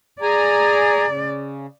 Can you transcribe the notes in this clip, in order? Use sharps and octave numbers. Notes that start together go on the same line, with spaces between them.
G#4 D5 G#5 A#5
C#3